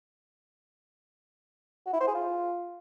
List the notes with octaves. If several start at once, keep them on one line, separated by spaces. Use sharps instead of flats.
F#4
E4
C5
G#4
F4